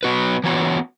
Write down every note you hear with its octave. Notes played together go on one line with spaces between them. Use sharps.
F#3 B3 F#4 B4
E3 B3 F#4 C#5